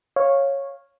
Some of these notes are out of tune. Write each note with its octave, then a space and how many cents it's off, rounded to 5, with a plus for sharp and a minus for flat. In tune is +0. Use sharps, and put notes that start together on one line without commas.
C#5 -10 F5 +0